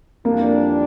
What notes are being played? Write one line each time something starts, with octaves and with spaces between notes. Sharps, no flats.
F2 E3 G3 A#3 D4